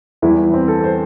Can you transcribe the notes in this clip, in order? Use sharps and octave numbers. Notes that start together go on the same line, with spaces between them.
E2 E3 G3 E4
C4
A4
C5